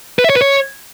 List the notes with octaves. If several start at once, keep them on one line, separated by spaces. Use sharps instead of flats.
B4
E5
C#5
B4
C#5